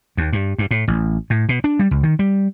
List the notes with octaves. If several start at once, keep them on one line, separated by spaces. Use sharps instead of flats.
D#2
G2
G2
A2
A1
A2
B2
D4
G3
C#2
D#3
G3